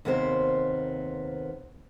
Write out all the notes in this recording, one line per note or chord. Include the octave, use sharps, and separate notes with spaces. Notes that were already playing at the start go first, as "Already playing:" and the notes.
D#2 C3 A#3 B3 C5